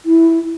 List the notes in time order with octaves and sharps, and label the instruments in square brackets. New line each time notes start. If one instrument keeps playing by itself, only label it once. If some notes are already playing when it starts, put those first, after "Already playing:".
[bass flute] E4